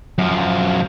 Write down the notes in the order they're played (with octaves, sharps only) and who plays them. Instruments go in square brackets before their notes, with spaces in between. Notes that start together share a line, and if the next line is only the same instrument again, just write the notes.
[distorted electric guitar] F#2 F3